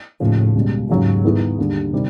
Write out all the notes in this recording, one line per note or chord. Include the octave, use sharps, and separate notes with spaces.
D#2 A2 C#3 F3
C#2 B2 G3
D#2 G#2 C#3 F#3
D#3 G3 B3 E4 G#4
D#2 D3 G3
C3 D#3 G3